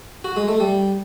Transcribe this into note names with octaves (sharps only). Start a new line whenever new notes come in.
F#4
G#3
A3
G3